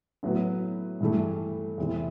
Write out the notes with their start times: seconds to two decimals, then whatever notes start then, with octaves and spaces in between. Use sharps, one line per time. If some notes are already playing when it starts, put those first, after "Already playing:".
0.23 A2 F#3 B3 F#4 B4
1.01 G2 E3 A3
1.78 E2 C3 E3